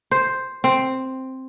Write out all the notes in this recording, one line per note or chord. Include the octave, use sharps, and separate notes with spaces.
C5
C4